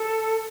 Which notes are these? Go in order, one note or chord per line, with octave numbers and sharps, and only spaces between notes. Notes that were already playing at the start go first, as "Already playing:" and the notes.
Already playing: A4